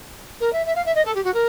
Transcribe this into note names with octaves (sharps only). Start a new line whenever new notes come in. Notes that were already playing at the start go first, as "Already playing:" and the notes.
A#4
E5
E5
F5
E5
D#5
A4
G4
F#4
A#4